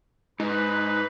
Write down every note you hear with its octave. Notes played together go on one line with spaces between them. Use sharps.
G#2 D#4 B4